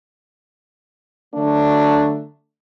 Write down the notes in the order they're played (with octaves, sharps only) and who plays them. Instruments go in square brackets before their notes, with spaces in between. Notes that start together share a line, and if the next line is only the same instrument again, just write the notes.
[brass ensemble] D3 F#3 A3 D4